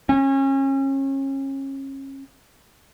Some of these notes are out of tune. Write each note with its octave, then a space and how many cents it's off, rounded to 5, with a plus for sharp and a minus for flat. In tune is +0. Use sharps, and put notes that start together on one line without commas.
C#4 -30